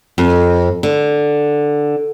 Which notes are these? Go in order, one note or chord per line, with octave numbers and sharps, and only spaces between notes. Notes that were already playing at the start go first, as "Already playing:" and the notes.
F2
D3